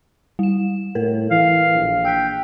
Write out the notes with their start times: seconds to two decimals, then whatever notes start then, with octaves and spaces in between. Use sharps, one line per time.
0.39 G3 E7
0.95 A2 A4 A#4
1.31 E3 F5
1.74 A#1
2.05 G5 E6 F#6 B6